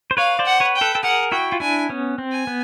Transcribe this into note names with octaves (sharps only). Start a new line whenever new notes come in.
C5
B4 C#5 F5
C5 D5
F#5
B4 C#5
G5
A4 B4
A4
G#4 A#4 F#5
E4 F#4 G5
F4
D4 E4 G#5
B3 C#4
C4
G#5
B3